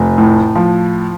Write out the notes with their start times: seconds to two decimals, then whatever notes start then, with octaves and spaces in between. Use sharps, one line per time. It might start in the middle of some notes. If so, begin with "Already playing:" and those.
Already playing: F1
0.18 A2
0.55 F3